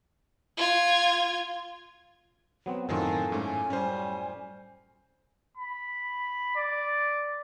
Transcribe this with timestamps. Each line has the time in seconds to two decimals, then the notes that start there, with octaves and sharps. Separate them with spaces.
0.57 F4 G#6
2.66 F#3 B3 C4
2.89 F#2 A2 D#3 F#3 C4 F4 A4 G#5
3.32 G#2 A3 C#4
3.70 G3 C#4 C5
5.57 B5
6.56 D5